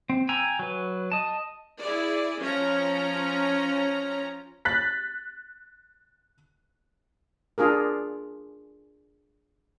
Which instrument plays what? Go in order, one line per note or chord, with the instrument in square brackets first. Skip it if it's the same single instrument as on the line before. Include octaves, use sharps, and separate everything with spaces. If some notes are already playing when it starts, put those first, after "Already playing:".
[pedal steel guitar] C4
G5 G#5 A#5 E6
F#3 B4
D#5 A5
[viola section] E4 G#4 D5
F3 C#4 F4 C#5 A#5
[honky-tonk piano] F#6 A6 B6
[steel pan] D4 F4 G#4 A#4